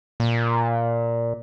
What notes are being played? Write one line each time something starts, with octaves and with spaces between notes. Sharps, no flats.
A#2